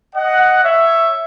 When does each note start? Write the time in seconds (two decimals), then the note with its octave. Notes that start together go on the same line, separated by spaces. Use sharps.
0.16 D#5 F#5
0.63 C#5 E5